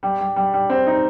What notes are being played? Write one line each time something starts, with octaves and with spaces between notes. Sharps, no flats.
G3
G3
G3
G3
C4
D#4